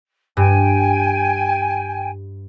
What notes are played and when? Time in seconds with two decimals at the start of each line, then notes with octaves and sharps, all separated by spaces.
0.37 G2 G5 G#5